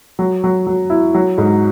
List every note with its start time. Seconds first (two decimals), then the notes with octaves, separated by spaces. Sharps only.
0.19 F#3
0.44 F#3
0.67 F#3
0.90 E4
1.14 F#3
1.38 G#2